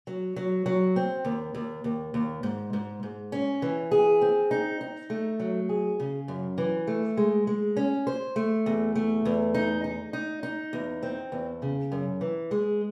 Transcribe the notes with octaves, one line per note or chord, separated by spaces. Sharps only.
F#3
F#3
F#3
C4
D#2
D#2
D#2
D#2
G#2
G#2
G#2
C#4
E3
G#4
C4
D#4
D#4
A3
F#3
G#4
C#3
F#2
E3
A3
G#3
G#3
C#4
C5
A3
E2
A3
E2
D#4
D#4
D#4
D#4
E2
C4
E2
C#3
F#2
E3
G#3